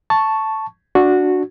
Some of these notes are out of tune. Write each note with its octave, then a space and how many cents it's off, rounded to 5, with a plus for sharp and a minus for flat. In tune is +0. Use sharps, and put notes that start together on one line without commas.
A5 +0 C#6 +0
D4 +0 F#4 -10